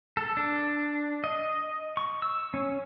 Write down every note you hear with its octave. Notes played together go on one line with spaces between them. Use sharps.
A4
D4
D#5
C#6
E6
C#4